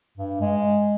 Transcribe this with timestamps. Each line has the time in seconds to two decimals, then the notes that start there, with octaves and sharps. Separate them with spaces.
0.17 G2
0.41 G#3